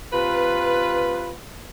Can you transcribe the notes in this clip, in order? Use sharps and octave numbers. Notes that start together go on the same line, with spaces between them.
C3 F4 B4